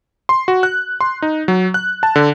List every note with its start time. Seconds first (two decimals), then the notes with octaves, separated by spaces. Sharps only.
0.29 C6
0.48 F#4
0.63 F#6
1.01 C6
1.22 D#4
1.48 F#3
1.74 F#6
2.03 A5
2.16 D3